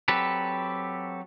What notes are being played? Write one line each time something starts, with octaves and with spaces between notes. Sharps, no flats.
F#3 C4 G4 A4 B4